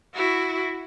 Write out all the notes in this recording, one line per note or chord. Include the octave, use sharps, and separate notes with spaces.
E4 F#4